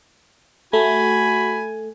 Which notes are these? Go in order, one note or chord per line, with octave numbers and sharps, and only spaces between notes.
A3 F#4 G#5 B5